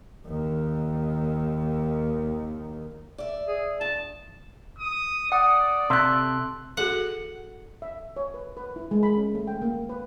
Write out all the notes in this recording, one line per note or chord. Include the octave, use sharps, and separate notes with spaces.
D#2 D#3
D5 E5
G#4
G2 A5
D#6
D5 F#5 D#6
C3 A4 E5 C6 F#6
F#4 G#4 A4 F#5
E5
C#5
B4
B4
E4
G#3
B5
C#4
A3
G5
A#3
B4